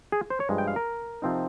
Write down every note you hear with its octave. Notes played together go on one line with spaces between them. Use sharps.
G#4
C5
C#5
G2 F3 G#3
G5
F5
A#4
C3 F3 C4 D#4